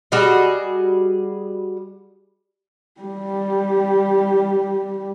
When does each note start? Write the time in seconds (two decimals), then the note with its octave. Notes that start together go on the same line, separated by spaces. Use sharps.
0.12 G3 F#4 G#4 D#5
3.01 G3 G4